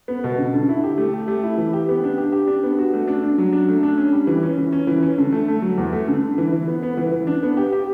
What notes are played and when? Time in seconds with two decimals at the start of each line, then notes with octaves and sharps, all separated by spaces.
0.08 B3
0.24 B2
0.38 D3
0.54 D3
0.69 E4
0.84 G4
0.98 A3
1.13 G4
1.28 A3
1.43 E4
1.58 E3
1.73 G4
1.89 B3
2.04 D4
2.18 G4
2.32 G4
2.47 D4
2.63 B3
2.79 F#4
2.94 A3
3.08 D4
3.24 D4
3.38 F#3
3.53 D4
3.68 A3
3.83 D4
3.98 C#4
4.12 G3
4.27 E3
4.43 C#4
4.58 E3
4.72 C#4
4.87 E3
5.03 C#4
5.18 D3
5.32 A3
5.48 A3
5.62 F#3
5.78 E2
5.93 A3
6.08 D3
6.22 D3
6.38 E3
6.53 E3
6.68 B3
6.83 B3
6.97 E3
7.12 E3
7.27 D4
7.43 B3
7.57 G4
7.73 G4